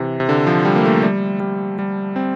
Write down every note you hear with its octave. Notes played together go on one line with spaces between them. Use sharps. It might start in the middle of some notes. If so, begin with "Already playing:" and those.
Already playing: C3 E3
C3
D3
F3
G3
A#3
A3
G3
G3
G3
C4